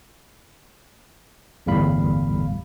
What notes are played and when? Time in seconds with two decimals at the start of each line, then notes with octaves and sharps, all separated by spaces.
1.66 G1 E2 A2 G3 F5 B5